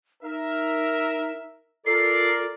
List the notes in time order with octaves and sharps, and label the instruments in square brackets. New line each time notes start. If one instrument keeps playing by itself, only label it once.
[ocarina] D#4 [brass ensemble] A#4 E5
[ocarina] F4 [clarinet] A4 [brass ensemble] A#4 D5 [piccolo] C7